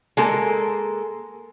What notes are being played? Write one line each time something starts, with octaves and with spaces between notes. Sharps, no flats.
G#3 A#3 A4